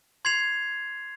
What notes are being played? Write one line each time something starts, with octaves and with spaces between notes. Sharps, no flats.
C6 G#6 C7 F7